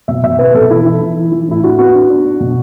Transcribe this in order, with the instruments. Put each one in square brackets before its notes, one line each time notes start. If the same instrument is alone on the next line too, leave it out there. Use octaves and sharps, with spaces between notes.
[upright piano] B2 E5
B2 E5
B3 B4
B2 A4
E3 E4
E3 E4
E3
E3
E3
A2 E4
D4 F#4
B3 F#4
D4
D4
D4
B2